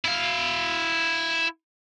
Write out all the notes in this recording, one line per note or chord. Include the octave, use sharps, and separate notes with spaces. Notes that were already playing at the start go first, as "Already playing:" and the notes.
E4 F5